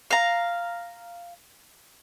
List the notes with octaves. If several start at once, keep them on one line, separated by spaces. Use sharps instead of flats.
F5 A#5